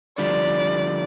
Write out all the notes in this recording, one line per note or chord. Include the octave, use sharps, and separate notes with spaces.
D3 F3 G3 D5